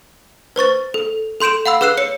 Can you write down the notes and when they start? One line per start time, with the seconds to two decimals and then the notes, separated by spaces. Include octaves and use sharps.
0.56 B4 C5 C#6 A6
0.94 A4
1.40 A4 C6 G6 D7 E7
1.66 F5 F#5 B5 E6
1.81 G#4 B4 E6 F#6 C7 E7
1.97 C#5 C#7